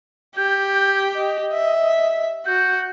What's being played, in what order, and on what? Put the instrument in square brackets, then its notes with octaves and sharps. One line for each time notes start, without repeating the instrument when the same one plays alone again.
[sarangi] G4 [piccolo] G6
[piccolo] D#5
[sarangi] E5
[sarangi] F#4 [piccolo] G6